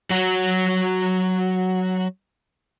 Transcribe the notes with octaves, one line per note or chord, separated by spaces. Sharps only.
F#3 F#4